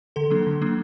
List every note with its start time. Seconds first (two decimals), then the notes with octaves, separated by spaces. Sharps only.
0.16 D3 A4
0.30 F#3 A#3 D4
0.47 D3
0.61 F#3 A#3 D4